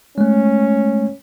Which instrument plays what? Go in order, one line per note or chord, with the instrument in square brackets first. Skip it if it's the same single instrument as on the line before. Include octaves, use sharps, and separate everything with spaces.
[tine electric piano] G#3 A3 [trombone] C#4